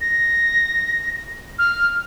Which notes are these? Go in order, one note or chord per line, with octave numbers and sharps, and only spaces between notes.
A#6
F6